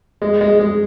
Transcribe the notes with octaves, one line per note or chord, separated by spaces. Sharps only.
G#3
G#3
G#3